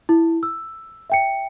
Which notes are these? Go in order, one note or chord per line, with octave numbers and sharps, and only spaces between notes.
E4
E6
E5 G5 C#7